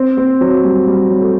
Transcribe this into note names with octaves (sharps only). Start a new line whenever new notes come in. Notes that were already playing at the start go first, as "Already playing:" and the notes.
Already playing: C4
C4
F#3
G3
G3
F#3
A3